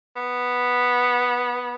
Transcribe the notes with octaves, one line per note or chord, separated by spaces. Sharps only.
B3